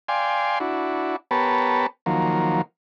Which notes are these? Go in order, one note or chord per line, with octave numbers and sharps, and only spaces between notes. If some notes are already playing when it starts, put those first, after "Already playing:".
D5 F5 G5 G#5 C6
D4 E4 F#4
B3 G4 A#4 B4 C#5 A5
D#3 F3 F#3 A#3